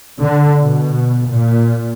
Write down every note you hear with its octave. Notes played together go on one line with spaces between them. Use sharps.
D3
B2
A#2